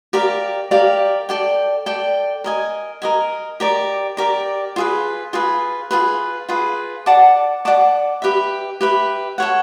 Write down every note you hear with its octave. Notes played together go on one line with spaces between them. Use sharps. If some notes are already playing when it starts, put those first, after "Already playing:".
G4 A#4 D5 F5
G4 A#4 D5 F5
A4 D5 G5
A4 D5 G5
A#4 D#5 G#5
A#4 D#5 G#5
G4 A#4 D5
G4 A#4 D5
F4 G#4 B4
F4 G#4 B4
F4 G#4 B4
F4 G#4 B4
D5 F#5 A5 D6
D5 F#5 A5 D6
G4 B4 E5
G4 B4 E5
A4 C#5 F#5